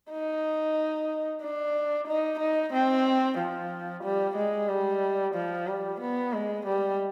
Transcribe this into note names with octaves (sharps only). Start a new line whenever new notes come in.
D#4
D4
D#4
D#4
C4
F3
G3
G#3
G3
F3
G3
B3
G#3
G3